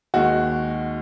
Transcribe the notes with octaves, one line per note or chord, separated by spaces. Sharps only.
D#2 D#3 G#3 F#4